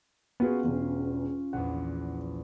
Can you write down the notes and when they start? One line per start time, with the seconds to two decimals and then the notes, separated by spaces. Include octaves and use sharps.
0.40 B3 C#4 F4 F#4 G#4
0.64 E1 E2
1.53 A#1 E2 F#5